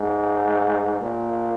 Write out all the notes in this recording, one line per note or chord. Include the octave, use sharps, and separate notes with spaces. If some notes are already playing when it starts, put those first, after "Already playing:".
Already playing: G#2
A#2